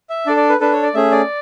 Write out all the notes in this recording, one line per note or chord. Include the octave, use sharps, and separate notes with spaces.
E5
D4 A4 D5
D5
B4
D4 A4 B4
C#5
D5
A3 C#4 G#4 E5
D5